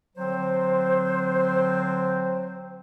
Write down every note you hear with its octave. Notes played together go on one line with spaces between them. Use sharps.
D3 F#3 C4 C5